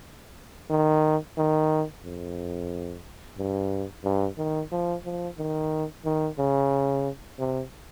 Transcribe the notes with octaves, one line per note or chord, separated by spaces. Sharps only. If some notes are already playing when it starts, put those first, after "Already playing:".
D#3
D#3
F2
G2
G2
D#3
F3
F3
D#3
D#3
C#3
C3